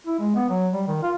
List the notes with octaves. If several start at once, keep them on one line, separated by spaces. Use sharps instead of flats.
E4
G#3
B3
F#3
G3
D#3
F4